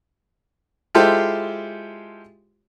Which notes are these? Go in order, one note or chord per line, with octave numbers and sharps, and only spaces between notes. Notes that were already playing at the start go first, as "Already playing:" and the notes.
G#3 E4 F4 G4 A4 C5